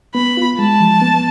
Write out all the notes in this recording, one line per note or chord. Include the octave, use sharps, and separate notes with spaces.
B3 B5
F4
G#3 A5
F3
B3